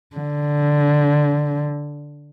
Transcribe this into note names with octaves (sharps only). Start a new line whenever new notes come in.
D3